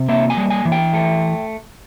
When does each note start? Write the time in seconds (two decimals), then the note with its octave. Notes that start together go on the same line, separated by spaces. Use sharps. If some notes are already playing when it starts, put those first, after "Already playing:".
Already playing: C3
0.09 A#3 E5
0.30 G#5
0.37 G3
0.50 G#5
0.65 E3
0.72 G5
0.93 A3